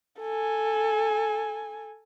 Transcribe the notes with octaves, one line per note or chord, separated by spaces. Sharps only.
A4 G#5